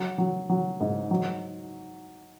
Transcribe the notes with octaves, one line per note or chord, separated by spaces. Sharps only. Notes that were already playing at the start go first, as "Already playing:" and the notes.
Already playing: F#3
F#3
F#3
G#2
F#3